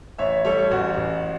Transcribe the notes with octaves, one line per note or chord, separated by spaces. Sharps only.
A1 C#5 E5
G3 A4 C#5
A1 F#4
A1